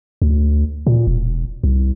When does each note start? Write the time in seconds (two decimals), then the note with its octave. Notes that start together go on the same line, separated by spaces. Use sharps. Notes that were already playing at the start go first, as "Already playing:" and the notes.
0.22 D2
0.87 A#2
1.07 E1
1.63 C2